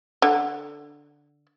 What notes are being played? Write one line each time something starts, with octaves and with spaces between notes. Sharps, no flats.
D3